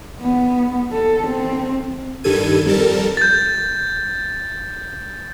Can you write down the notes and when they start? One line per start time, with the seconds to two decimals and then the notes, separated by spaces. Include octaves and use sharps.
0.21 B3
0.92 A4
1.27 C4
2.24 G2 D#3 G3 A4 G#6 D#7
2.66 F2 G3 A4 A#4 A5
3.17 G6 A6